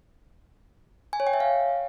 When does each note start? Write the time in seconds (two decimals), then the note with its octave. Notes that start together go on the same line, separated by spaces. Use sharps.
1.13 G#5
1.20 C#5
1.27 G5
1.33 E5
1.40 F5